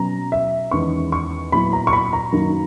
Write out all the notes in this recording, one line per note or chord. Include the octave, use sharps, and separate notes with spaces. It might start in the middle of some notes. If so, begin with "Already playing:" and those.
Already playing: B2 F#3 C#4 A#5
E5
E2 D#3 G#3 C#4 C#6
C#6
A#2 F#3 B3 E4 B5
A#5
C#6
B5
A#5
F#2 D#3 F#3 A#3